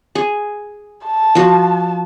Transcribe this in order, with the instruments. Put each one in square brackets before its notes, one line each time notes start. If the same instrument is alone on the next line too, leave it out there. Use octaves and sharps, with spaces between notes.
[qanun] G#4
[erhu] A5
[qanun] F3 F#4